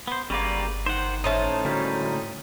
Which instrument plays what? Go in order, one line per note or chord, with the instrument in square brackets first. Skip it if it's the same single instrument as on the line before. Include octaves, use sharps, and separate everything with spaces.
[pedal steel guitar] B3 C5
[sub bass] G1 [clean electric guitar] C#3 A#3 [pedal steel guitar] G3 B4 D5
[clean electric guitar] D#3 [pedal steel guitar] C5 F#5
[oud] A2 C#4 E5 [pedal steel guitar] D#4 C5 A5
[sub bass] D3 [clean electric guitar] F#3 G3 A#3